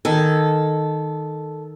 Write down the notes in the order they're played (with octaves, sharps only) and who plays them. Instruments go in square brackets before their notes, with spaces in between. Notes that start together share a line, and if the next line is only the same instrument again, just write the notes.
[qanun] D#3 G#5 [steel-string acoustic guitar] A4